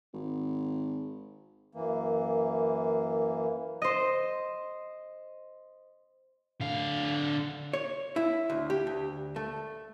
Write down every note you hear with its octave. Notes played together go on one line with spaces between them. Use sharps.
G#1
F#2 E3 A#3
C5 D#5
D3 F5
C#5
E4
D2
G4
D2
A3